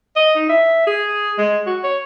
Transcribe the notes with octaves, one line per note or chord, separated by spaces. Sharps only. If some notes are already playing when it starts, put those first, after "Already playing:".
D#5
D#4
E5
G#4
G#3
F#4
C#5